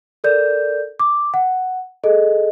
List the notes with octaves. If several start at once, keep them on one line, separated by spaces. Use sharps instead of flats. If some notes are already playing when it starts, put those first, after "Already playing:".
A4 A#4 D5 G6
D6
F#5
G#4 A4 D#5